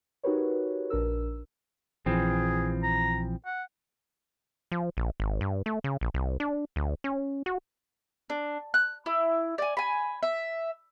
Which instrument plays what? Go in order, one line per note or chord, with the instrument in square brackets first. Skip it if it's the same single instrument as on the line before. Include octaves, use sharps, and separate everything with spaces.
[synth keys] D#4 F#4 G4 A#4 B4 C#5
A#1 D4 A#4 E6
[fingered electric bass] A#1 [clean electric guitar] E3 F3 C4 [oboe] G#4
[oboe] A#5
F#5
[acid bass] F3
A#1
G#1
G2
A3
C#3
A#1
C2
D4
D2
C#4
F#4
[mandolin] D4
F#6
E4
D5 G#5
G#5 B5
E5